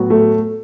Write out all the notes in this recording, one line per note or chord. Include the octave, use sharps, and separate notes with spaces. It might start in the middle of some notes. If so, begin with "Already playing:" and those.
Already playing: A2 F#3 B3 F#4
A3